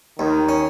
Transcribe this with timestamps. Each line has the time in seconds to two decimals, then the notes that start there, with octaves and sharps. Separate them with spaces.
0.19 D#2 D#3
0.49 C#4